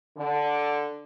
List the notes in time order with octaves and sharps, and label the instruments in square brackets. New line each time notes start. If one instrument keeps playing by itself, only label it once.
[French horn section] D3